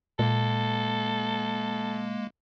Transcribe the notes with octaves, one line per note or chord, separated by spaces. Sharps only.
A#2 G#3 A#3 A4